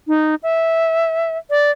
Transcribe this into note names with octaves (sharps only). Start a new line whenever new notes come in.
D#4
E5
D5